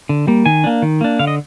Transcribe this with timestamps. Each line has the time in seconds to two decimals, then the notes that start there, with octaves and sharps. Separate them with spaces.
0.09 D3
0.27 G3 A#3
0.46 D#3 G#5
0.64 A#3 D4
0.82 D#3
1.01 A#3 D4
1.19 D3 F5
1.27 D#5